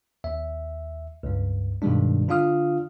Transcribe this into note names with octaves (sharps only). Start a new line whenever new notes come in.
D#2 E5
C#2 G2
G2 B2 D#3 G3 G#3 D4
D3 D4 F4 F5 D#6 F6